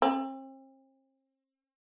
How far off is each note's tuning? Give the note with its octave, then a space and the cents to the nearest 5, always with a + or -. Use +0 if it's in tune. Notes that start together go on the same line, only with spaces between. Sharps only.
C4 +40